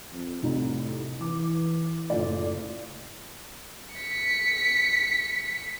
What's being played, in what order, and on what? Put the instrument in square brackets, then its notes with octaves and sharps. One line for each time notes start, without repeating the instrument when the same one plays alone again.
[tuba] F2
[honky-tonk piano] F1 C2 D#4 [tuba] A2
[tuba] E3 [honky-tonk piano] D6
[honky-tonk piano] F#1 F4 D5 [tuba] A2
[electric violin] B6 C#7